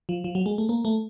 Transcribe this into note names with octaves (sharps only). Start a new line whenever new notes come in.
F3
F3
F#3
G#3
A3
A#3
A3